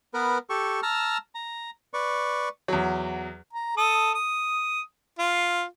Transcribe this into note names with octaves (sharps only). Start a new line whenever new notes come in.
B3 A#4 B4
G4 A4 C#6
A5 A#5 E6 F6
A#5
B4 D5 C#6
E2 F#3
A#5
A4 D#6
D#6
F4